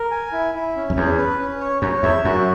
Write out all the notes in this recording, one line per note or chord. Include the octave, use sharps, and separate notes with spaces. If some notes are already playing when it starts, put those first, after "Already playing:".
Already playing: A#4
G#5
E4
E4
C#4
F#2
E2 C#4
B4
C#4
C#5
F#2 C#5
E2 E5
F#2 F#4